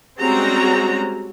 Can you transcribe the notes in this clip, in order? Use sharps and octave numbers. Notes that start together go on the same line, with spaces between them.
G3 G#3 C4 C#4 F#4 A#5